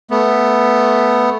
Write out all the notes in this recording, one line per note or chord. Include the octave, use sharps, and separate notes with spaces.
A3 B3